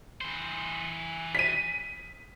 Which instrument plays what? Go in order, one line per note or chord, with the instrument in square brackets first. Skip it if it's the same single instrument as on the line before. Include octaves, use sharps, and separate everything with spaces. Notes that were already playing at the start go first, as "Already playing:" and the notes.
[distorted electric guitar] E3 C5
[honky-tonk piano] B6 D#7